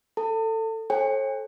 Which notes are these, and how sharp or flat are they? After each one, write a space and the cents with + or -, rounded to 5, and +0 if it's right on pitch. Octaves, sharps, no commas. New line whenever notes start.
A4 +15 A5 +40
A4 -20 C#5 -45 G5 +45